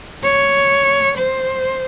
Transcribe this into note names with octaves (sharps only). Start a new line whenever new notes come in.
C#5
C5